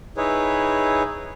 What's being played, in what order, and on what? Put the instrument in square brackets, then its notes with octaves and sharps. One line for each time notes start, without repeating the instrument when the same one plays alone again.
[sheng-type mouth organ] D#4 E4 G#4 B4 C#5